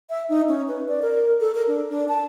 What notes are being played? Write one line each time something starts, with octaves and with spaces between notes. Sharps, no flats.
E5
D#4
C#4
B4
D5
A#4
A4
A#4
D4
D4
A5